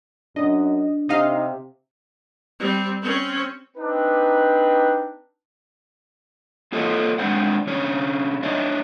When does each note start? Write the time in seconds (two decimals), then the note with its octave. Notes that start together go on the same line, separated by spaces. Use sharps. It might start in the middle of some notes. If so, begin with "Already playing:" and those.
0.36 F#2 D4 D#5
1.09 C3 D#4 D#5 F5
2.60 G3 C4
3.02 C4 C#4
3.77 C4 D4 D#4 B4
6.72 A#3 F4 A4 C#5 D#5
7.18 G#3 C4 D4 C5 F#5
7.67 C3 C#4 D4 C#5
8.43 D4 D#4 C#5 D#5 E5